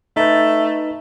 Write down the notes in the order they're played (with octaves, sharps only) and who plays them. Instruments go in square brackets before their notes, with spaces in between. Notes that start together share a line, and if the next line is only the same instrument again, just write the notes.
[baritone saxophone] A3 [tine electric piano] D#4 B4